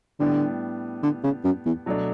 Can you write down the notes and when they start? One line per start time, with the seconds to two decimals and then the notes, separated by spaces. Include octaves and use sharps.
0.20 A2 D3 G3 B3 D4
1.03 D3
1.24 C#3
1.44 F#2
1.65 E2
1.86 B2 F#3 A3 D4